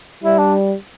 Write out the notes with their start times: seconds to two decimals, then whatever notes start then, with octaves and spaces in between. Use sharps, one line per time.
0.23 G3 E4
0.38 D4